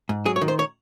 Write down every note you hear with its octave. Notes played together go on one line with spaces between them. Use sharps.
G#2
F#3 G#4
C#5
D#3
C5
C#5